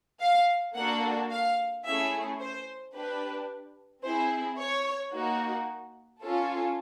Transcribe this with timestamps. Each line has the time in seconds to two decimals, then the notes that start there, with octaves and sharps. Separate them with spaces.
0.21 F5
0.76 A#3 D4 F#4 A4 F#5
1.30 F5
1.85 A3 C#4 E4 G#4 E5
2.40 C5
2.94 D4 G4 B4
4.03 C4 E4 G#4 C5
4.58 C#5
5.13 A#3 D#4 F#4
6.22 C#4 F4 A4